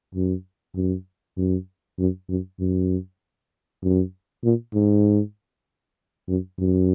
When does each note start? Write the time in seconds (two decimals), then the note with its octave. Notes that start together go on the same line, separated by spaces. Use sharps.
0.15 F#2
0.76 F#2
1.37 F#2
1.99 F#2
2.29 F#2
2.60 F#2
3.83 F#2
4.44 A#2
4.74 G#2
6.28 F#2
6.59 F#2